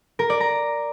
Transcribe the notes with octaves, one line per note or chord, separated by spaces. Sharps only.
A#4
D5
A#5